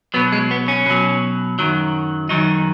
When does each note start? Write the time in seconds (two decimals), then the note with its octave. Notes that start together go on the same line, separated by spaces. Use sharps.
0.14 B2 F#3 B3
0.32 G#3
0.51 B3
0.68 C#4
0.86 B2 F#3
1.59 F#2 D#3 F#3
2.29 F#2 D#3 F#3 D#4